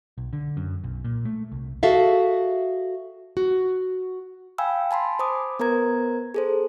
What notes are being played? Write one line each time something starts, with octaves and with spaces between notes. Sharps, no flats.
B1
D3
F#2
B1
A#2
A3
C2
F#4 G#4 A4 E5 F5
F#4
F5 G5 G#5 B5 E6
G#5 A5 B5 C6
C5 B5 D6 D#6
B3 A#4 C5 A#5 G#6
G#4 A4 C5